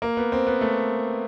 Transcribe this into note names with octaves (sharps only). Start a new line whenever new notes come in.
A#3
B3
C4
B3
A3